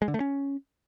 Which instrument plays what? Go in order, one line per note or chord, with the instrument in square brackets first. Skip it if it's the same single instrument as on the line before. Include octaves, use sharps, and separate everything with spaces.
[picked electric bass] G#3
D3
A3
C#4